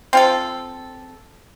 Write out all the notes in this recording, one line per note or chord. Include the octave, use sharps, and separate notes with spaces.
C4 F4 A4